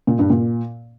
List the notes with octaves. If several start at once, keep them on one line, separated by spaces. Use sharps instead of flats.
A#2
G2
A#2